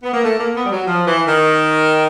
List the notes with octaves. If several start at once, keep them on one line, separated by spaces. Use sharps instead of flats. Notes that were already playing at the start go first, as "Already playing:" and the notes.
B3
A#3
A3
A#3
B3
G3
F#3
F3
E3
D#3